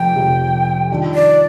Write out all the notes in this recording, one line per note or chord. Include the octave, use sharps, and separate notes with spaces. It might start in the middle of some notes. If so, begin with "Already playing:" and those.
Already playing: F1 F2 C3 G5
F1 F2 C3
D#3 G3 D4 F4
D5